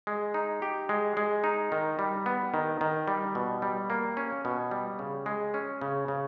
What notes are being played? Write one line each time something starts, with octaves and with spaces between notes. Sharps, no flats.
G#3
D#4
G4
G#3
G#3
D#4
D#3
G3
B3
D#3
D#3
G3
B2
G3
A#3
C#4
B2
G3
C#3
G#3
C#4
C#3
C#3